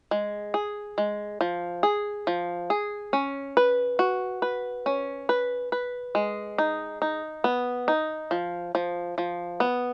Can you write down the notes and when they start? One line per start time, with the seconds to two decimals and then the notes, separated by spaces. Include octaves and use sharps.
0.11 G#3
0.54 G#4
0.98 G#3
1.41 F3
1.83 G#4
2.27 F3
2.70 G#4
3.13 C#4
3.57 B4
3.99 F#4
4.42 B4
4.86 C#4
5.29 B4
5.72 B4
6.15 G#3
6.58 D#4
7.02 D#4
7.44 B3
7.88 D#4
8.31 F3
8.75 F3
9.18 F3
9.60 B3